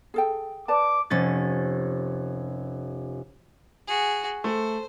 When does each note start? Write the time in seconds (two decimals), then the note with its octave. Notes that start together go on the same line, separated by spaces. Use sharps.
0.14 G#4 A4 G5
0.68 B4 D5 A5 D6
1.10 F1 C#4 A6
3.87 F#4 G#4
4.44 A3 C5